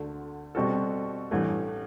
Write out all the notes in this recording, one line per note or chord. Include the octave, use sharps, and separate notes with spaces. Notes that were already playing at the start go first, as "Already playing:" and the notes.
Already playing: D2 D3 A3
B2 G3 C4 F#4 A4
A1 G2 E3 A3